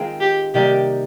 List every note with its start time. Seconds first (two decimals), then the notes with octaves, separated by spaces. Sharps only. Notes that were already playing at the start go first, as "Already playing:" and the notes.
Already playing: D#3 G#3 C4 F4
0.21 G4
0.54 C3 D#3 G3 A#3 G4